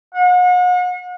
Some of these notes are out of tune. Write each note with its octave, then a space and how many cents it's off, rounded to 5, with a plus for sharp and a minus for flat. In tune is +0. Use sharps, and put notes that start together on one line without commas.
F#5 -40